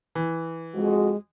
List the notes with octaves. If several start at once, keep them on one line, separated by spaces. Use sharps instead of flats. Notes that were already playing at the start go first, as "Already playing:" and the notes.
E3
F2 G#3 F#4